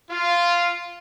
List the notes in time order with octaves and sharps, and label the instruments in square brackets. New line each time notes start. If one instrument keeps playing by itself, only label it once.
[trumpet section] F4